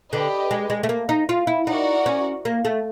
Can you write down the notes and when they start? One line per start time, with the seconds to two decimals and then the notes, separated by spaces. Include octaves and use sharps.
0.12 D3 D4 G4 B4 D#5
0.51 G#3
0.70 G#3
0.83 A3
0.89 A#3
1.09 D#4
1.29 F4
1.47 E4
1.67 D#4 F#4 A#4 D5 F#5
2.06 C#4
2.45 A#3
2.65 A3